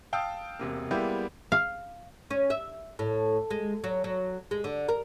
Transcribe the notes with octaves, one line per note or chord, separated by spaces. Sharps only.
F5 G5 A5 D#6 E6
E1 C3 A#3
G3 G#3 A#3 B3 E4 G4
F5
C#4
E5
A2
G#3
F#3
F#3
G#3
D3
A#4